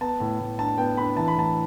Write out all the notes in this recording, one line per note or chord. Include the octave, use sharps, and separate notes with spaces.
B3 A5
A2
A2
D4 A5
B3 G5
D4 B5
E3 A5
B5
A2 A5